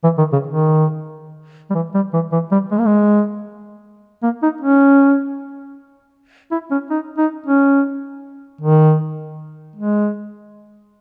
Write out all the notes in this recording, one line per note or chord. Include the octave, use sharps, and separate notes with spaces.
E3
D#3
C#3
D#3
G3
E3
G3
E3
E3
G3
G#3
A#3
G#3
A#3
D#4
C#4
E4
C#4
D#4
D#4
C#4
D#3
G#3